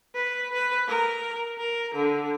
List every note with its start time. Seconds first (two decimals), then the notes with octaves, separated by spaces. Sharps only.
0.15 B4
0.52 B4
0.88 A#4
1.58 A#4
1.95 D3